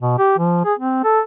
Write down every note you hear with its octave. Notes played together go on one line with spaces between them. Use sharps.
B2
G4
F3
G#4
C4
A4